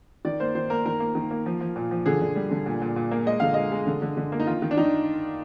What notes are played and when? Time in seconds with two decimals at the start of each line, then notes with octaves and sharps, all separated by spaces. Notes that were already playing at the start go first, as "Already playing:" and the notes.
0.25 D#3 D5
0.40 A#3 C5
0.55 D#3 C5
0.70 A#3 A#4
0.85 D#3 A#4
1.00 A#3
1.15 D#3
1.31 A#3
1.46 F3
1.61 F3
1.76 A#2
1.91 F3
2.06 D3 G#4
2.21 D3
2.36 G3
2.51 D3
2.66 A#2
2.82 A#2
2.96 A#2
3.11 A#3
3.26 G#3 D#5
3.40 D3 F5
3.54 G#3 D#5
3.72 G#3
3.87 D3
4.02 D3
4.17 D3
4.32 A#3
4.40 D#4
4.47 D#3 F4
4.62 D#3
4.71 D4
4.77 D#3 D#4